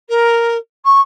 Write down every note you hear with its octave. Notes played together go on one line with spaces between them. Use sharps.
A#4
C#6